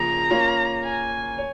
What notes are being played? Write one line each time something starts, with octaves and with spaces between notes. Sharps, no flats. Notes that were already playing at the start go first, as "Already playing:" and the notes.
Already playing: C#3 F3 A#3 A#5
A#3 C#4 F4
G#5
C#5